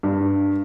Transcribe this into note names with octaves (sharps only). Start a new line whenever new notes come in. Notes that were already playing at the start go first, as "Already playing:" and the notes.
G2